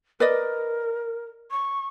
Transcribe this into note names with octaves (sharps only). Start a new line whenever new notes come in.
A#4 B4 D5 D#5
C#6